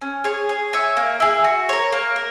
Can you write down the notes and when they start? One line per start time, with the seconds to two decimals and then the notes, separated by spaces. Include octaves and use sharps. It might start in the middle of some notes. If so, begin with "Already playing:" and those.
0.02 C#4
0.24 G#4 C#5
0.49 G#4
0.73 C#5 E5 G#5
0.97 A#3
1.20 E4 G#4
1.44 F#4
1.69 A#4 C#5
1.92 A#3
2.16 A#4